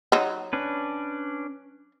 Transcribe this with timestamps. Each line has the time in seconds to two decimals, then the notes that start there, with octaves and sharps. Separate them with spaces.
0.12 F#3 D#4
0.53 C#4 D4 B4